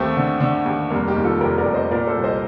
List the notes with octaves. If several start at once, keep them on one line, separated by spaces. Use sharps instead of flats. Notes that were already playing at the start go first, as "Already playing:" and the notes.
Already playing: D#2 A3 C4
D3
D3
D#2
F1 G3 A#3
D#4 G4
D#2
F4 A4
F1 G4 A#4
A#4 D5
F1
C5 D#5
A#2 A#4 D5
A4 C5
C2
C5 D#5